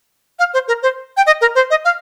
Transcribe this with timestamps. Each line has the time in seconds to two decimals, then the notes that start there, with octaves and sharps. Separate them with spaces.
0.39 F5
0.54 C5
0.68 A#4
0.83 C5
1.17 G5
1.26 D#5
1.41 A#4
1.55 C5
1.71 D#5
1.85 F5